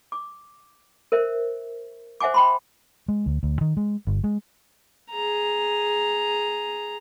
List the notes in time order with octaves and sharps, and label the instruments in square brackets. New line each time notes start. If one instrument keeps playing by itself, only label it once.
[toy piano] D6
A#4 C5 E5
C5 E5 F#5 G#5 D6
G5 B5 C6
[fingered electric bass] G#3
D2
D2
D#3
G#3
G1
G#3
[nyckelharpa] G#4 A#5